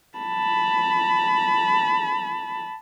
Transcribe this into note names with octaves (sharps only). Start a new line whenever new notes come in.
A5 B5